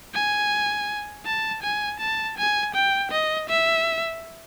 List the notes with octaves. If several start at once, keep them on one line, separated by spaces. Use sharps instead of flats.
G#5
A5
G#5
A5
G#5
G5
D#5
E5